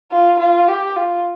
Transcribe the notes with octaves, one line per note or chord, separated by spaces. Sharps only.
F4
F4
G4
F4